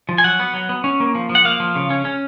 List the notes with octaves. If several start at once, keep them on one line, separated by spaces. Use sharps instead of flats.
F3
G#5
F#3 F#5
B3
F#3
B3
C#4
A#3
F3
F3
F#5
A#3 F5
F3
C#3
C#4
C#4